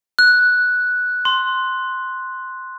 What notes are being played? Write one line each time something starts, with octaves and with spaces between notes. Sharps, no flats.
F#6
C6